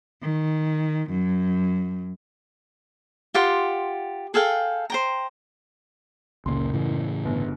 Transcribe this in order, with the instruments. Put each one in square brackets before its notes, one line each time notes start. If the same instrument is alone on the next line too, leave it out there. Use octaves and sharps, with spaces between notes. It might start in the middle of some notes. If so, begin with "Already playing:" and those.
[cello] D#3
F#2
[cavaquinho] F4 G4 F#5 C6
G#4 A4 F5 G5
C5 G5 A#5
[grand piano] F#1 C6 [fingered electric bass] C#2 A#2
[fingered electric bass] A2 C#3 E3
[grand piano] G1